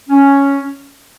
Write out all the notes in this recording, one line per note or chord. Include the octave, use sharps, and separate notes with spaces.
C#4